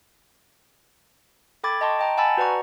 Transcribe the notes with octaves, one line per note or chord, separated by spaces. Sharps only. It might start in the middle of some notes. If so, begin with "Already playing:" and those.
A4 G5 B5 D6 G#6 A6
D#5 G5 A5 C6 C#6
D#5 G5 A#5
F#5 G#5 A5 B5 E6 A6
F#4 B4 D5 F#5 A#5 C#6